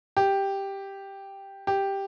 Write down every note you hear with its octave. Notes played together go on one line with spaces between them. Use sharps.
G4
G4